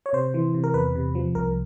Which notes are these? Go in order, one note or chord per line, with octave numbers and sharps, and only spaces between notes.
C#5
C3 C5
E3
C3
A#4
E2 B4
C3
F3
C2 A#4